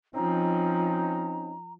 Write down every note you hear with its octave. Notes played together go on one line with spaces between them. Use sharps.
F3 C4 C#4 D#4 A#5